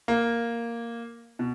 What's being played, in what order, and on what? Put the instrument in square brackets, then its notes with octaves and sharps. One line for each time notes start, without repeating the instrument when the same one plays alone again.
[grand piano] A#3
B2